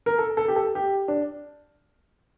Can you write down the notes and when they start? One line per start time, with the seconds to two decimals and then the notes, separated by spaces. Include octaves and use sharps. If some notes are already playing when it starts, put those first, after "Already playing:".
0.06 A#4
0.18 A4
0.37 A4
0.48 G4
0.56 A4
0.75 G4
1.08 D4